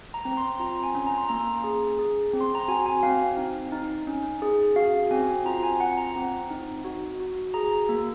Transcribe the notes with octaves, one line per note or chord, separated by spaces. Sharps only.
A#5
C4
C6
F4 A#5
G#5
C#4
A#5
C6
A#3 A#5
G#4
G#4
C4
C6
A#5
F#4 G#5
G#5
C4 F5
D#4
D#4
C#4
G#4
F#4 F5
C4 G#5
F4 A#5
G#5
F4 F#5
A#5
C4
D#4
F#4
F#4
G#4 A#5
A#3